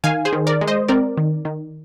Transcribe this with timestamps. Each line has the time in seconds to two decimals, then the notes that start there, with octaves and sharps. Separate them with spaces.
0.04 D#3 F5 G#5
0.25 G#4 C5
0.33 D#3
0.47 A#4 D5
0.61 G#3
0.67 C5 D#5
0.88 C4 A#4 D5
1.17 D#3
1.45 D#3